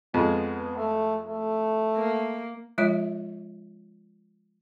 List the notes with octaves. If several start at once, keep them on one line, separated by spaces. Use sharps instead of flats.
F2 G#3 B3
A3
A3
A#3
F3 G#3 F4 C#5 E5